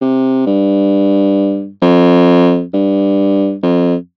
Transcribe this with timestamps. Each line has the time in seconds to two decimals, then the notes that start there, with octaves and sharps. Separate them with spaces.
0.01 C3
0.46 G2
1.82 F2
2.73 G2
3.63 F2